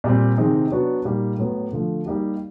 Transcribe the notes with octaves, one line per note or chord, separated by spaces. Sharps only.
A#2 G3 C4
C3 D#3 G#3 C4 D#4
F#3 B3 D4 F#4
A#2 G3 A#3 D#4
A2 F#3 B3
D3 F3 A3
G3 A#3 D#4 G4